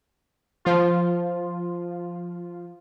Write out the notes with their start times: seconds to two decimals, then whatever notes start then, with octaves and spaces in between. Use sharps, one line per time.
0.65 F3 F4